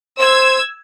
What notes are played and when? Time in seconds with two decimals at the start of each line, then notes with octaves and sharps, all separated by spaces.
0.19 C5 E6 G#6